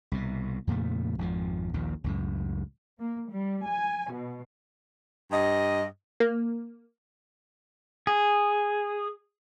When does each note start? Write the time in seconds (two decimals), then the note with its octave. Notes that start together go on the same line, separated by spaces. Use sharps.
0.12 C2 B2
0.67 F2 A#2 C#3 A3
1.18 G#1 F2 B2 F3
1.74 A#1 D#2 A#2
2.04 C#2 F#2 A2
2.99 A#3
3.29 G3
3.67 G#5
4.12 B2
5.32 G2 D#5
6.20 A#3
8.07 G#4